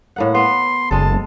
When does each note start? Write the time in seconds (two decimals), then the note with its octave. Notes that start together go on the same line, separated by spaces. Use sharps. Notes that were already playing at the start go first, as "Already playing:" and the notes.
0.16 A2 A#3 F#5
0.35 B3 C6
0.91 F#1 G#3 A4 A5